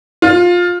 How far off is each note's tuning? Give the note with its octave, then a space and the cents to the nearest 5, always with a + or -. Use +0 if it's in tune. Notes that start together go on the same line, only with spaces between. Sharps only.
F4 +15